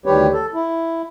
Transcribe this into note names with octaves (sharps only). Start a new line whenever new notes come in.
D2 D#3 G3 G4 B4 C#5
A4
E4